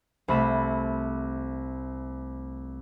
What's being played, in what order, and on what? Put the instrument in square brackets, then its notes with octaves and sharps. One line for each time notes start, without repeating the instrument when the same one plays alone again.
[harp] C2 A3 B5 B6 E7